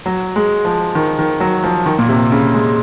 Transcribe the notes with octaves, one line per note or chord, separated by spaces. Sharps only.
F#3
G#3
F3
D#3
D#3
F#3
F3
D#3
A#2
C3
C#3
G#3